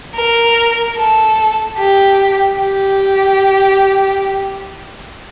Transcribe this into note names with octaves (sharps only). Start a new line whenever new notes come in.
A#4
A4
G4
G4